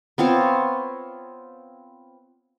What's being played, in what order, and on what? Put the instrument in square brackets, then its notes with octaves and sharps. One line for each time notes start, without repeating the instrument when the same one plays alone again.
[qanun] B3 C4 F4 C#5